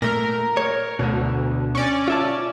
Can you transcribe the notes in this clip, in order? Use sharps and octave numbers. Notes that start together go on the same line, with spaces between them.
A#2 A3 A#4
C#5
D2 B2 D3
C#4 D5
F4 E5 A5